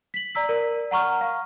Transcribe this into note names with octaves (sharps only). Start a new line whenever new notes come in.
B6 F#7
D5 A#5 E6 B6
A#4 D5
F#5 A#5 C#6 F6
F5